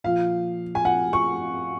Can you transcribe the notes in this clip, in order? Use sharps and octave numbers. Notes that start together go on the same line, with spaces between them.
A#2 F3 F5
G#5
F#5
C#6